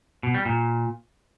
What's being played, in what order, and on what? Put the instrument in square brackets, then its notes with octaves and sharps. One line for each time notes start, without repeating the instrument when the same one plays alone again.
[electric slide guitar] B2
G3
A#2